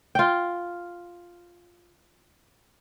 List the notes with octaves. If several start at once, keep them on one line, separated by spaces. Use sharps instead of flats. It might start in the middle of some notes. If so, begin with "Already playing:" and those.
F4 G5